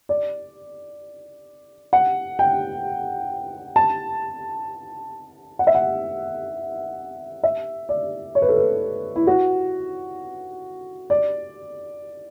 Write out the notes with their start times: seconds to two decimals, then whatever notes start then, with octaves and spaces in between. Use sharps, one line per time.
0.09 D5
1.93 F#5
2.39 G5
3.76 A5
5.59 F#5
5.67 E5
5.75 F#5
7.43 E5
7.89 D5
8.35 C#5
8.42 B4
8.49 A4
8.57 B4
9.16 E4
9.27 F#4
11.10 D5